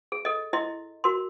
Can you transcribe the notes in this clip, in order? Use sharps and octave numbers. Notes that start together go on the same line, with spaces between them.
G#4
A4 D#5
E4 D#5 C6
F#4 A#4 C6